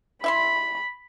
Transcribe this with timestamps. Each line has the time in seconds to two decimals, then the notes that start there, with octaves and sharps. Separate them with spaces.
0.24 E4 E5 B5 C6